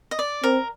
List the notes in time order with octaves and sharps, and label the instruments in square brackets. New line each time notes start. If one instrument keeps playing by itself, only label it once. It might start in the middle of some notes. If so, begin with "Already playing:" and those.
[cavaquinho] D#5
D5
[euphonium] C4 [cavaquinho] A#4